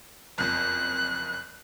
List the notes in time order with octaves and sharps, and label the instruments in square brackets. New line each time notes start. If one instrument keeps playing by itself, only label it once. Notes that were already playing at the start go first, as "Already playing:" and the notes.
[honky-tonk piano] F#1 F2 [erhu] F#6